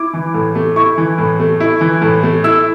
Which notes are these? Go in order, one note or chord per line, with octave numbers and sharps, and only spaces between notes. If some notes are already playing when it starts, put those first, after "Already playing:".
Already playing: E4 D6
E3
A2
A3
E4 C#6
E3
A2
A3
E4
E3
A2
A3
E4 E6